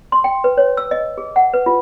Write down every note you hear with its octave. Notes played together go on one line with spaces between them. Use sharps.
C6
G5
B4
C#5
E6
D#5
G#4
F#5
B4
F4